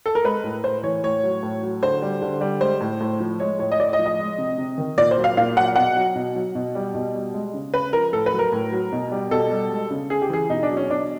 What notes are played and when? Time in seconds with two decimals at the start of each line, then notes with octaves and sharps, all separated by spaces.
0.06 A4
0.15 A#4
0.24 G#3 B4
0.44 A2
0.64 A2 C5
0.83 E3 C#5
1.04 A2 C#5
1.23 F#3
1.43 A2
1.63 F#3
1.83 D3 C5
2.02 G3
2.22 D3
2.41 G3
2.61 G#3 C5
2.81 A2
3.01 A2
3.20 F3
3.40 G#3 C#5
3.59 A2 C#5
3.72 D#5
3.80 A2 D5
3.93 D#5
3.99 F3
4.06 D#5
4.19 G#3
4.38 C3
4.58 C3
4.78 D#3
4.98 A#2 D5
5.11 C5
5.17 F#3
5.24 F5
5.37 A#2 F5
5.57 F#3 F#5
5.76 B2 F#5
5.96 F#3
6.16 B2
6.36 F#3
6.55 B2
6.75 G3
6.95 B2
7.14 G3
7.34 G#3
7.54 C#3
7.73 C#3 B4
7.93 F3 A#4
8.13 A2 A4
8.26 B4
8.33 F#3
8.39 A#4
8.52 A2
8.72 F#3
8.92 B2
9.12 G3
9.31 B2 A4
9.51 G3
9.71 G#3
9.91 C#3
10.10 C#3 G#4
10.22 G4
10.30 E3 G#4
10.50 B2 D#4
10.63 D4
10.69 F#3
10.77 C#4
10.89 B2 D4